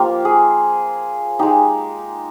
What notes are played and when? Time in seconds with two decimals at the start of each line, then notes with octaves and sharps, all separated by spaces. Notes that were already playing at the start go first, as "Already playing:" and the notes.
Already playing: F3 A#3 F4 G4
0.25 G#4
1.39 G#3 D#4 G4